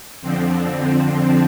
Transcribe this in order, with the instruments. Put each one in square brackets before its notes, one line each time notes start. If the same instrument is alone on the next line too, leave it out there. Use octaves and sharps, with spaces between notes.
[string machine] F2 D3 F3 C4